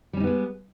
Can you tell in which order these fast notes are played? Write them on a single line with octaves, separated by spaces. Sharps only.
G3 C#4 D#4 B3 G#3